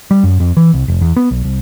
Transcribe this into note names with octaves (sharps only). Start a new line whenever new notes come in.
G3
F#2
F2
E3
C2
F1
E2
B3
B1
C2